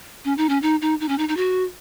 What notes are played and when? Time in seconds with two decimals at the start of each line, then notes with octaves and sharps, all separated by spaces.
0.25 C#4
0.38 D#4
0.49 C#4
0.63 D#4
0.81 D#4
1.00 D#4
1.09 C#4
1.18 D#4
1.29 D#4
1.37 F#4